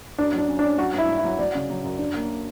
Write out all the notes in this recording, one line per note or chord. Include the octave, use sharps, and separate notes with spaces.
F#2 D4
F#3
D4
C#4
D4
C#4
F#3 F#4
G2 E4
G2
E4
F#3
F#3 D5
C#3
F#3
F#2
D4
A#3